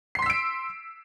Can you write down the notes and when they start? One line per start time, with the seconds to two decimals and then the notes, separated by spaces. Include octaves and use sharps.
0.15 C7
0.19 C6
0.22 B6
0.26 E6
0.30 D7